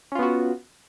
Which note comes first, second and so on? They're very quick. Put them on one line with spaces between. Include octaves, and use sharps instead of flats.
C#4 F4 B3 F#4